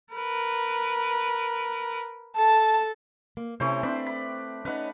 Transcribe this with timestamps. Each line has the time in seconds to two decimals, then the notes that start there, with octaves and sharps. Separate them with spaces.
0.14 A#4 B4
2.36 A4 A5
3.37 A#3
3.60 C3 E3 A3 C#4 C5
3.83 C4 D4 B5
4.07 B5
4.65 C#4 D#4 B4 F#5